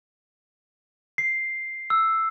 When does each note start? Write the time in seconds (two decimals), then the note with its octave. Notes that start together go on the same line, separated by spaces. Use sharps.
1.18 C7
1.90 E6